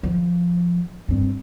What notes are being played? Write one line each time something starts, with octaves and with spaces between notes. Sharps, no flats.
F3
G2 C4